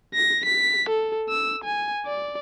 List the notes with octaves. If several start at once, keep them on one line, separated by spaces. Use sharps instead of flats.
A#6
B6
A4
E6
G#5
D5